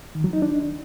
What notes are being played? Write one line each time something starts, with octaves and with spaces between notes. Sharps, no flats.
D#3
F#3
D#4
D4